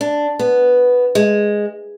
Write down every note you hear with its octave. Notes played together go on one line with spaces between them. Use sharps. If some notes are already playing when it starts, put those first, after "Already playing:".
D4
B3
G#3